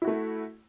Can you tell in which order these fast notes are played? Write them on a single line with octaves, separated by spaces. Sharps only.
E4 F#4 A3